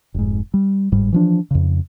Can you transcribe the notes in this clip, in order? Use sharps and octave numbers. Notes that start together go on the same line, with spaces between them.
F1 G#2
G3
G1 G#2 G3
E3 F3 D4
F2 C#3